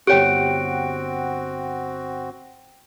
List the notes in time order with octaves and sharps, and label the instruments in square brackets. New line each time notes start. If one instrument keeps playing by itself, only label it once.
[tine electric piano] G1 F#5 [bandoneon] C4 F#4 [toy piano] G4 C#5 [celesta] G5 D7